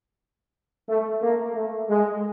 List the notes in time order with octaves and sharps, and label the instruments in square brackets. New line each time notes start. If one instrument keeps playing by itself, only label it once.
[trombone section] A3
A#3
A3
G#3